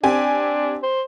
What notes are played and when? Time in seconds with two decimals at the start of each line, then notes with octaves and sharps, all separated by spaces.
0.03 C4 D4 G4 G#5
0.83 C5